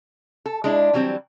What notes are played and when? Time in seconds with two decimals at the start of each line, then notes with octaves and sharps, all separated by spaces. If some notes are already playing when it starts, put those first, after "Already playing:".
0.46 A4
0.64 G#3 D4 E4
0.93 E3 F#3 G3 C4